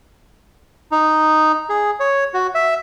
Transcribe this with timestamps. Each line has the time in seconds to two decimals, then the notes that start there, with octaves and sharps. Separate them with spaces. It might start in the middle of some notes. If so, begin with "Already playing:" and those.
0.92 D#4
1.69 G#4
2.00 C#5
2.34 F#4
2.55 E5